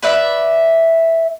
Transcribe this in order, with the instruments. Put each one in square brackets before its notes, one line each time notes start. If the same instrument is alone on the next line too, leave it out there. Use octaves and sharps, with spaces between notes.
[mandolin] B4 D5 E5